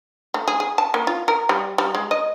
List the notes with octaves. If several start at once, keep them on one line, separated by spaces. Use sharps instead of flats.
A3
G#4
G#4
A5
A#3
F4
A#4
G3
G3
G#3
D#5